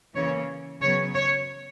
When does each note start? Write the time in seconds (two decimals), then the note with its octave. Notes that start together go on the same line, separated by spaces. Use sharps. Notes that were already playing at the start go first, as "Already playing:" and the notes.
0.15 C#3 E3 A#3 C#4 C#5
0.81 C#3 F#3 B3 C#5
1.15 C#5